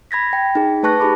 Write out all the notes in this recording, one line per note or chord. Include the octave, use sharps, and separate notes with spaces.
B5 G#6 A#6 B6
G5
D#4 G#4
A3 B4 A5 C#6 F#6 A#6
D#4 G4 G#4 B5 D6